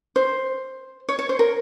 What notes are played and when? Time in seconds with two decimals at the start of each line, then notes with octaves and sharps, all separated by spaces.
0.16 C5
1.09 C#5
1.19 C#5
1.29 C5
1.39 A#4